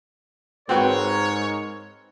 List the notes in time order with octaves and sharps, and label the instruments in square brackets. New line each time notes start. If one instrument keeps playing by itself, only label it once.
[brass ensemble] G#2 A#4 C#5 [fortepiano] C4 F#4 B4